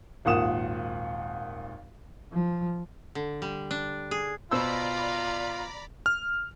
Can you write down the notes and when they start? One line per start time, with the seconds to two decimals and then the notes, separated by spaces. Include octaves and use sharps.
0.25 G#1 D#2 A#2 F#5 D#6 E7
2.33 F3
3.15 D3
3.42 G3
3.71 D4
4.11 G#4
4.51 B2 F4 C5 D5 A#5 B5 E6
6.06 F6